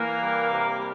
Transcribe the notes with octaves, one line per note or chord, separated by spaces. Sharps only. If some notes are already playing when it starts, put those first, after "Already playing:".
Already playing: E3 A#3 A#4
G3
C3
G3